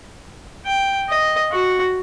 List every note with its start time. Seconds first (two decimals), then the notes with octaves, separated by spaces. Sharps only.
0.66 G5
1.09 D#5
1.52 F#4